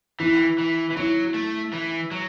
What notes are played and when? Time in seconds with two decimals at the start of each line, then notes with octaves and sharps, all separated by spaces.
0.20 E3 E4
0.58 E3
0.90 E3
0.97 F#3 E4
1.34 A3
1.73 E3
2.11 F#3